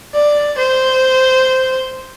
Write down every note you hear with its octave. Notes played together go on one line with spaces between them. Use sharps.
D5
C5